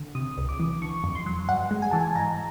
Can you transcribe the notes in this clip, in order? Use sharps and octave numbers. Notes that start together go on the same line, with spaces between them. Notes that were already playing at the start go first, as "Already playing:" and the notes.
Already playing: D3
C3 D#6
C#2
D6
E3
D3 C#6
F2
C6
F#3
G2 F#5
G#3
G#5
E3 A5
G#5
G#2 A#5